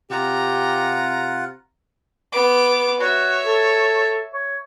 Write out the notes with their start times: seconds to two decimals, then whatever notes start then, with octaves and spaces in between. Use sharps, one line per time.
0.11 C3 F4 G4 F#5 A#5
2.32 B3 D6
3.00 F#4 C#5 E5
3.46 A4
4.33 C#5